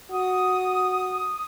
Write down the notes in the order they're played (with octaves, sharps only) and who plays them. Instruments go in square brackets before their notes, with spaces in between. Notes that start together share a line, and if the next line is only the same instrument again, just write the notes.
[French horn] F#4 [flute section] D#6